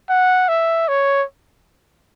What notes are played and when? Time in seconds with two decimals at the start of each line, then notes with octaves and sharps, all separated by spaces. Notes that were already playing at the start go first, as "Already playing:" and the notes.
0.09 F#5
0.49 E5
0.88 C#5